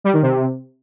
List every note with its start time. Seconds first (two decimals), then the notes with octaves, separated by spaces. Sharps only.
0.04 G3
0.13 D#3
0.22 C3